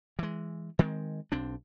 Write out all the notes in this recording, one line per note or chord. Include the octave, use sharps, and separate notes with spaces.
E3 G#3
D#3 G#3 C4
B1 C4 D4